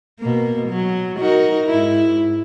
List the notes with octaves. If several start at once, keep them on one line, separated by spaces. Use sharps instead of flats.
B2 A#3
F#3
D#4 F#4 A#4
G#2 E4